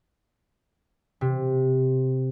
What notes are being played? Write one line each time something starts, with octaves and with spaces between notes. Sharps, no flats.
C3